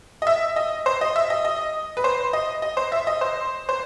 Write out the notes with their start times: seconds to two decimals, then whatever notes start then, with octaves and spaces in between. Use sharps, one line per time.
0.22 D#5
0.27 E5
0.56 D#5
0.86 C5
1.01 D#5
1.16 E5
1.30 D#5
1.45 D#5
1.97 B4
2.04 C5
2.33 D#5
2.62 D#5
2.77 C5
2.92 E5
3.07 D#5
3.21 C5
3.69 C5